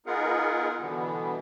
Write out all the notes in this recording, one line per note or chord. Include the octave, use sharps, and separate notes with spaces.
B3 D#4 F4 G#4 A#4 F#5
B2 D3 E3 G3 B3